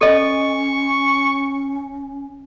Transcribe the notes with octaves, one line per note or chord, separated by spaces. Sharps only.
C#4 A4 D#5 C#6